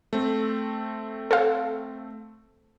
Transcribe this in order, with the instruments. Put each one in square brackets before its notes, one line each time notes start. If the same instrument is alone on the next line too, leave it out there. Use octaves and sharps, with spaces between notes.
[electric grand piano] A3 C4
[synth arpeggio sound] A4 C5 F5